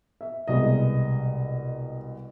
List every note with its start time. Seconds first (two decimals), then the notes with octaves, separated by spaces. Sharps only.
0.21 E5
0.48 C2 B2 G#3 D#5